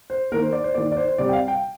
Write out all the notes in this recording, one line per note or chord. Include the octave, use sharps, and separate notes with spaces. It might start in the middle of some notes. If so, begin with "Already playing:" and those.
C5
D#3 A#3 A#4
C5
D5
C5
D#3 A#3 D5
D5
C5
C5
C3 G3 C4 D5
G5
F5
G5